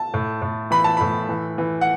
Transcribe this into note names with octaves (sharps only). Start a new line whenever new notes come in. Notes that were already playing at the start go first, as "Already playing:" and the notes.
Already playing: A5
A2
A2
E3 B5
A5
A2 B5
E3
E3
F#5